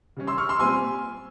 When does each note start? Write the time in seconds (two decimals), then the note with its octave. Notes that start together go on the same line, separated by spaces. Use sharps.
0.16 C#3 G3 C#4
0.27 C6 E6
0.38 C#6 F6
0.49 C6 E6
0.59 A#2 G3 C4 G#5 C6